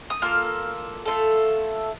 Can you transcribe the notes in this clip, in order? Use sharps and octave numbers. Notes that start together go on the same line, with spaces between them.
D#6
A#3 F4 A4 F6
A3 C4 F4 A4